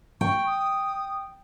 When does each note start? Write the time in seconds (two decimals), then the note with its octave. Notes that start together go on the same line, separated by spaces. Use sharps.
0.21 G5 C#6
0.47 D#6